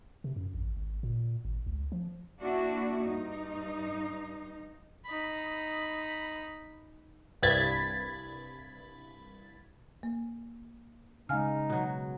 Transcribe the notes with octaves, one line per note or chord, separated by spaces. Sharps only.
C3
F#2
A1
G#1
A#2
G#1
C#2
F3
A#3 D4 E4 F#4
G2 D#4
D#4 B5
C2 G2 B5 G#6 A6 B6
A#3
C#3 G#3 D#4 F5 G#5 F6
B2 F#3